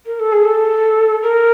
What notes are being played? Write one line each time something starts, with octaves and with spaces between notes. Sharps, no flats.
A#4
A4
G#4
A4
A#4